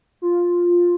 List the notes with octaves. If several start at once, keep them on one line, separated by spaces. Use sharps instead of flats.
F4